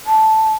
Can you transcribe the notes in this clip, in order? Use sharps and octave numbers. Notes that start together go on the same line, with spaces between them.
A5